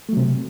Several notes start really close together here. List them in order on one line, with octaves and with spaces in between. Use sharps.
A3 F#3 C3